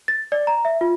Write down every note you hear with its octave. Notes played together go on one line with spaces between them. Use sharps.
A6
D5
A#5
E5
F4